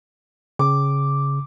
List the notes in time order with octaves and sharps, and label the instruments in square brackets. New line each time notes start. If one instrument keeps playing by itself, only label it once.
[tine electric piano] C#3 [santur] D6